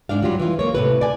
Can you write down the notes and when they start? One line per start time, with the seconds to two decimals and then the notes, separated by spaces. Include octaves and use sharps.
0.09 G#2 D4 F5
0.22 F#3 G3 F4
0.39 E3 F4
0.59 A#3 C#5
0.75 A2 C3 B4
1.01 D5 G#5